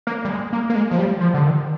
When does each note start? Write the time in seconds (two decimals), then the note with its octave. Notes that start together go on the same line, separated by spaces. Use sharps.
0.07 A#3
0.25 G3
0.29 G#3
0.52 A#3
0.70 A#3
0.75 G#3
0.91 F3
0.98 G3
1.21 F3
1.34 D3
1.43 D#3